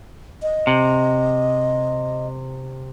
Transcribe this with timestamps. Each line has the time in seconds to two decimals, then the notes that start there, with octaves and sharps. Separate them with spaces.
0.42 D#5
0.67 C3